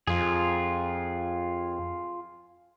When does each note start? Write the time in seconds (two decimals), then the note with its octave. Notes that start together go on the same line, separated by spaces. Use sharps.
0.07 F2 F4 G#4